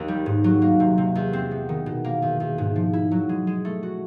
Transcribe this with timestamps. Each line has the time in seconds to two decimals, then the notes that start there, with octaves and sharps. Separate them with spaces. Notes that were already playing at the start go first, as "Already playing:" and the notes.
Already playing: D#2
0.08 G3
0.26 G#2
0.44 F#3
0.62 A#3
0.80 C3
0.98 C3
1.15 E2
1.33 C4
1.51 B3
1.69 D#3
1.86 B2
2.04 A#3
2.22 E2
2.40 E2
2.58 G#2
2.76 F3
2.93 E4
3.11 F#3
3.29 G#3
3.47 G#3
3.65 A3
3.83 F#4